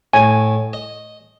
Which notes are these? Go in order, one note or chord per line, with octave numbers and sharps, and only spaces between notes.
A2 G#5
D#5